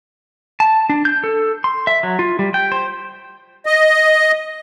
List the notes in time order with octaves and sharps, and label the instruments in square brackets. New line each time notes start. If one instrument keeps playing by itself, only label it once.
[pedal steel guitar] A5
D4
G6
A4
C6
E5
F#3
F4
G3
G5
C5
[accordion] D#5